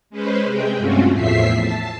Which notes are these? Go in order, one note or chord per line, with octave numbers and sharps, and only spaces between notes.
G#3 C#4 B4 C5
C3 G#3 G#4 G5
G2 A3 C4 C#4 F4 F#4
E2 A2 F3 E5 B6 C7
A5